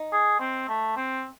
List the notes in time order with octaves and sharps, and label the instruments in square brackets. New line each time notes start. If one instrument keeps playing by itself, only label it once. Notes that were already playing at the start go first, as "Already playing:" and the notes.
Already playing: [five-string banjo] D#4
[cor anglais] G#4
C4
A3
C4